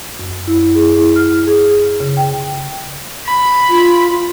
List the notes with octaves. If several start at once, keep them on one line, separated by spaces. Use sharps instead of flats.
F#2
E4
G#4
E4
F6
G#4
C#3
G5
B5
F4